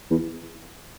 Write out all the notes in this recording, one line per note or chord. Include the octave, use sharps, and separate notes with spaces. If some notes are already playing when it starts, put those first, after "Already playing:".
E2